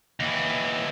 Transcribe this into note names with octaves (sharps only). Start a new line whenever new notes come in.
D#2 E3